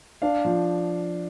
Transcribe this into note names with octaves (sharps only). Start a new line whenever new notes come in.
D4 F5
F3